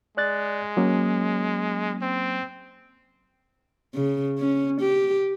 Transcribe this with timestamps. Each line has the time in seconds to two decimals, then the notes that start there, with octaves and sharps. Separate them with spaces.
0.17 G#3 D5 F#6 A6
0.77 F#3 A#3 C#4
2.02 C4
3.95 C#3
4.38 C#4
4.81 G4